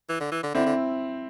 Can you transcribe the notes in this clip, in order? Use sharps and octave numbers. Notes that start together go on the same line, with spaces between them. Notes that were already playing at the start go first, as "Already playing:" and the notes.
E3
D3
E3
D3
D3 C4 E4
D3